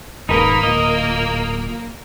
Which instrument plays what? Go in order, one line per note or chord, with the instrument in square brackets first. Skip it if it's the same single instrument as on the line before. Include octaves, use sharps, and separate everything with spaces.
[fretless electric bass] D#1 G#2 [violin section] A#3 [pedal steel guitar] D#4 B4 D#5
[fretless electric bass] D1 A#2 [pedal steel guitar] D#5